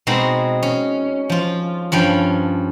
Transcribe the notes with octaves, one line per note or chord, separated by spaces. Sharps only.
B2 G#3 C4 D#4 F#4
C#4
F3 F4
G2 F3 C#4 G5